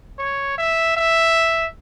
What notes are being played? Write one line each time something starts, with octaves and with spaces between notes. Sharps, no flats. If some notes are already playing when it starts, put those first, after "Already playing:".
C#5
E5
E5